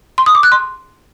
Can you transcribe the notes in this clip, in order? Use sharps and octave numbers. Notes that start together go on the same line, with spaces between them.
C6
D#6
D6
F#6
C6